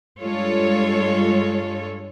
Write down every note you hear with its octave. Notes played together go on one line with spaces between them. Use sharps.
G2 G3 G#3 F4 A4 C#5